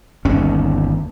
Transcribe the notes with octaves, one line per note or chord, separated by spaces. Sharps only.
G1 D#2 D3 C#4